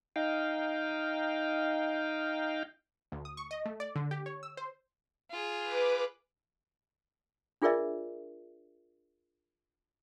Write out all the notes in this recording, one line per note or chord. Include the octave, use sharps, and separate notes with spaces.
D#4 F5 G5
D2
D#6
C#6
D#5
A3
D5
D3
G4
C#5
E6
C5
F4 G#4
B4 D6
D4 F4 G#4 A#4 D5 E5